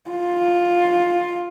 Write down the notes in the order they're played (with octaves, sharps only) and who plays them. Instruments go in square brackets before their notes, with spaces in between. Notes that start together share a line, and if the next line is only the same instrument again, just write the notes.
[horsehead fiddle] F4